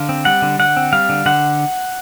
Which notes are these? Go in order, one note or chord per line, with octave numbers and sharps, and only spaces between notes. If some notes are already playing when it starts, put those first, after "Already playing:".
Already playing: D3 F5
C4
G3 F#5
D3
D3 F#5
C4
G3 F5
D3
D3 F#5